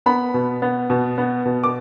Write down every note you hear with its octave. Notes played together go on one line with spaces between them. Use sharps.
B3 B5
B2
B3
B2
B3
B2
D6